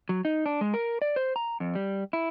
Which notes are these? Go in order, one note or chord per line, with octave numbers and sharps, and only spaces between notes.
F#3
D#4
D4
G#3
A#4
D5
C5
A#5
F2
G3
E4